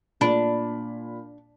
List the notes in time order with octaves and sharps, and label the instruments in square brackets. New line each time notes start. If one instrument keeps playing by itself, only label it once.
[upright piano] A#2 B5 [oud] D4